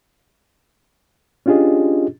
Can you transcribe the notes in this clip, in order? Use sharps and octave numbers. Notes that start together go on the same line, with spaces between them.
C#4 D4 F4 G4 G#4 D#5